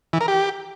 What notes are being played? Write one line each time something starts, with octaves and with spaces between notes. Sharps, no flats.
E3
A#4
G4